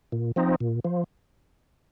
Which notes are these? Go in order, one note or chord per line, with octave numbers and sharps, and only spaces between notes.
A#2
F3 C4 D#4
A#2
F3